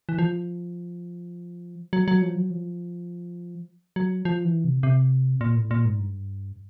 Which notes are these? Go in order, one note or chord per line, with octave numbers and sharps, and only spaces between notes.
E3
F3
F#3
F#3
F3
F#3
F3
F#3
F3
E3
C3
C3
A#2
A2
A#2
G#2
G2